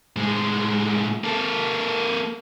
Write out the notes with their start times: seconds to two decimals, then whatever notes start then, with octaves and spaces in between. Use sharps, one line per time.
0.16 A2 G#3
1.24 A#3 A4